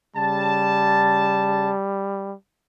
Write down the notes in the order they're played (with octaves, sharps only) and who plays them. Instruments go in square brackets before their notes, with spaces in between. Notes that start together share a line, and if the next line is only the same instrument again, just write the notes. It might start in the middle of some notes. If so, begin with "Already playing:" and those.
[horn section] C#3 A5 [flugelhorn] G3